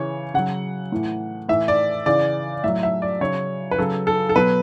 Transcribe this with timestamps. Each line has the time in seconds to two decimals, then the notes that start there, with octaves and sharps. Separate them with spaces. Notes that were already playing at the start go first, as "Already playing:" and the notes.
Already playing: C#3 E3 C#5
0.34 C#3 F#3 F#5
0.92 A2 E3
1.48 A2 E3 E5
1.68 D5
2.06 C#3 E3 D5
2.64 A2 F#3 E5
2.83 E5
3.02 D5
3.21 C#3 F#3 C#5
3.71 B4
3.78 C#3 F#3 A4
4.07 A4
4.29 A4
4.36 B2 F#3 B4